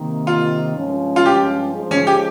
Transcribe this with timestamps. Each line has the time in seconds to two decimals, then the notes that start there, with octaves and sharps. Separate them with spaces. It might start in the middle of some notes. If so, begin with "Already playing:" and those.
Already playing: C3 D#3 A#3
0.27 F4
0.76 G2 F3 G#3 C#4
1.16 F4
1.26 G4
1.74 F3 G#3 D#4 G#4
1.91 C#4
2.07 G4